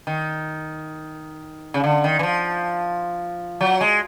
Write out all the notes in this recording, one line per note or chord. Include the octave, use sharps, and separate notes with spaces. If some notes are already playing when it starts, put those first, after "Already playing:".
D#3
C#3
D3
D#3
E3
F3
F#3
G#3